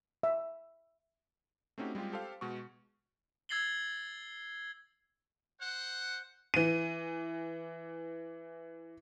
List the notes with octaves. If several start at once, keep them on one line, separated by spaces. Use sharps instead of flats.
E5
A3 C4 C#4 D#4 F#4 G4
G3 G#3 C4 F4 G4
G4 A4 C5 F5
B2 G#3 F#4 C#6
E6 G#6 A6 C7 F#7 G7
C5 F#5
E3 D#7